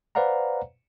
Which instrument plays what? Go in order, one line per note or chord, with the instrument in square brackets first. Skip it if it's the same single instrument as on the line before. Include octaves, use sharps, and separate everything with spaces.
[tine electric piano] B4 C5 D5 F5 F#5 A#5